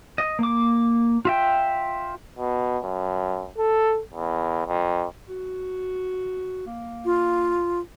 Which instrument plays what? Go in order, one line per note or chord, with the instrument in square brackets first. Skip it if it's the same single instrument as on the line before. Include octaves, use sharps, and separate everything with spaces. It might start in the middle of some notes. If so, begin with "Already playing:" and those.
[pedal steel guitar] D#5
A#3 D6
F4 E5 G5
[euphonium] B2
F#2
A4
E2
F2
[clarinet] F#4
A#3
[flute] F4